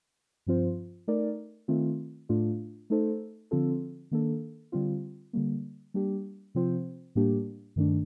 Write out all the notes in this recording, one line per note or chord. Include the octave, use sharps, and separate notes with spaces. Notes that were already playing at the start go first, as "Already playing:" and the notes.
G2 F3 C4 F4 C5
A3 D#4 A#4 D5
D#3 A3 C4 F4
A2 A3 D4 F4
A3 D#4 A4 C5
D3 F3 C4 F4 A4
D#3 A#3 D4 A4
D3 G3 C4 F4
D3 G3 A#3
G3 A#3 D4 G4
C3 F3 C4 F4 C5
A2 G3 A#3 D4 G4
G2 D#3 A3 D4